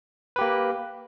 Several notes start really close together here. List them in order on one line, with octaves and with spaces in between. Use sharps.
B4 G4 A#3